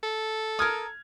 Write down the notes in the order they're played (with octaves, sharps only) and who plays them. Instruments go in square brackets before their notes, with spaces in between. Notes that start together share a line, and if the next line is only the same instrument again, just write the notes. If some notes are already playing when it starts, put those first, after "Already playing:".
[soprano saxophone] A4
[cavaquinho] A#4 D#6 [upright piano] F6 G#6